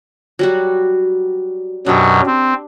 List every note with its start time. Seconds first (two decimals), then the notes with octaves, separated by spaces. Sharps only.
0.39 F#3 G3 F#4
1.86 F#2 B2 F#3 D4 G4
2.26 C4